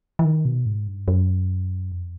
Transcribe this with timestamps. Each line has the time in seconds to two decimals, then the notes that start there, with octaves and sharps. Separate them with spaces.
0.19 E3
0.25 D#3
0.45 B2
0.66 G#2
0.87 G2
1.08 F#2
1.92 F2